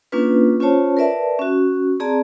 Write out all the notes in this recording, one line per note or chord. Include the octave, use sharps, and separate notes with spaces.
A#3 C#4 D4 F4 B4
C#4 F4 C5 C#5 A5
A#4 B4 D5 E5 A5
C#4 F#4
C4 G#4 D5 A5 A#5